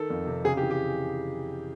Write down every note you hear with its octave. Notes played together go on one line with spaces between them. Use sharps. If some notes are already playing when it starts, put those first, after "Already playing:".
Already playing: D#3 A4
F2
C3
C#3 G#4
G4
E3
G4